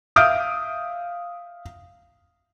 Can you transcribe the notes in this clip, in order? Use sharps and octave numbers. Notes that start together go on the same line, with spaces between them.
E5 F5 D#6 F6 G6 D7